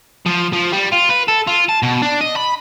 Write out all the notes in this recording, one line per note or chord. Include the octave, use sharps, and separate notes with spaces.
F3
F3
G3
F4
B4
A4
F4
A5
B2
D4
D#5
B5